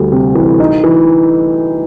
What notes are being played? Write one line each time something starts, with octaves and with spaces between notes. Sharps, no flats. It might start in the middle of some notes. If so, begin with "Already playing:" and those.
Already playing: D2 G3
C3
E3
D#4
E3